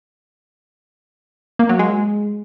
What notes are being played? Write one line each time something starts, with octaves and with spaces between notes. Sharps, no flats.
A#3
F#3
G#3